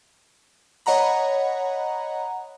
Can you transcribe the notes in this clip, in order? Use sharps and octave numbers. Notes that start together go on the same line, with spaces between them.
C#5 D#5 F#5 A#5 B5